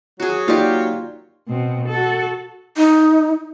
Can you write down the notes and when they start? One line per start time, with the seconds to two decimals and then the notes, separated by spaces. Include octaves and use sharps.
0.20 F#3 F#4 G#4
0.48 A#3 D#4 F4 G4 D5
1.48 B2 C4
1.88 F#4 A4
2.77 D#4